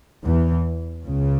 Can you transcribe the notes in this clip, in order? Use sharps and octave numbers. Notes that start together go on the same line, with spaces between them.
E2 E3
C#2 C#3